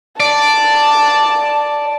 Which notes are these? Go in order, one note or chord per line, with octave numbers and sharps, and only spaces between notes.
D5 A5